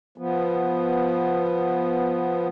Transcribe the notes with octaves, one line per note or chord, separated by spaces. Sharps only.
F3 B3